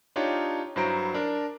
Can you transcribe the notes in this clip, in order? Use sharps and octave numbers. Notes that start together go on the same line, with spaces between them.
D4 D#4 F4 G4 C#5
G2 F#3 E4 C5 A#5 D7
D4 A#4